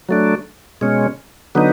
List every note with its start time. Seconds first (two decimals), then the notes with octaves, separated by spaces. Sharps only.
0.09 F#3 A3 D4
0.81 B2 G#3 C#4
1.55 D3 F#3 B3 D#4